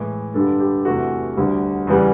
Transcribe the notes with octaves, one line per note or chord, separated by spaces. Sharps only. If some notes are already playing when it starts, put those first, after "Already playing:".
Already playing: A2 E3 G#3
G2 D3 G3 A4
G4
E2 C3 E3 A3 F#4
D2 D3 G3
E2 C#3 E3 G3